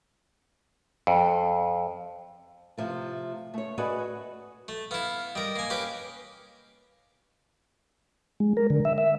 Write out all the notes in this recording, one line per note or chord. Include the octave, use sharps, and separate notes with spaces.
F2
C3 F3 A3
A3 C#5
F#4 G#4 A4 B4 D5 D#5
A3
B3 E4 F5
G3 A#4 D#5
A#3 G#5
C#4 G4 B4 F5
G#3
A#4
D3
E5
E5